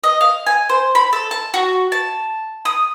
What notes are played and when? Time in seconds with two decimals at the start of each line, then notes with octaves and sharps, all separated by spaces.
0.04 D#5
0.21 F5
0.46 G#5
0.69 C5
0.95 B5
1.13 A4
1.31 A5
1.54 F#4
1.92 A5
2.65 D#6